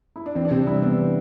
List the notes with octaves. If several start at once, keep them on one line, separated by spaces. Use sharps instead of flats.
E4
D4
E3 C4
D4
C3 C4
G3 E4
B3 D4
E3